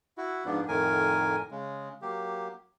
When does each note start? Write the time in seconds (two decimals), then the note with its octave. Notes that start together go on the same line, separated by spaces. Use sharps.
0.18 E4 F#4
0.45 G#2 F3 B3 D4
0.68 F2 A2 D#3 A#4 G#5
1.51 C#3 G#3
2.02 F#3 A#3 G4